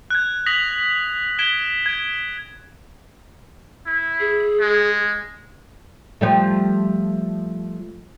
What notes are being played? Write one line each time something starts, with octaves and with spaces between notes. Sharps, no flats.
F#6 G#6
D#6 A#6 B6 F7 F#7
G#6 B6 D7 E7 G7
G#6 D7
E4
G#4
G#3
F3 G3 A3